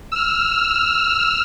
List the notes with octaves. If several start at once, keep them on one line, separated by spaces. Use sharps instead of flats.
E6 F6